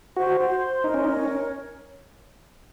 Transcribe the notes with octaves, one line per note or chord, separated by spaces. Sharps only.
F#4 C5
C5
C6
D#4 A#4
C#4
D#4 C#5
C#4
A#4